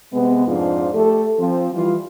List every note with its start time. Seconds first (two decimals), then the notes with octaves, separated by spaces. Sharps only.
0.13 C3 G#3 B3
0.47 F2 G#2 F3 D4 F4
0.95 A3 G4 A4
1.39 F3 C4
1.74 E3 G3 E4 F4